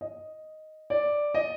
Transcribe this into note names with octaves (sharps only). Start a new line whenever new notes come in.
D#5
D5
D#5